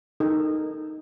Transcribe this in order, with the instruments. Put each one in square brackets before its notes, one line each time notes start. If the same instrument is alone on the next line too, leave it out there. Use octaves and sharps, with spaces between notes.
[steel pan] D#4 A4 A#4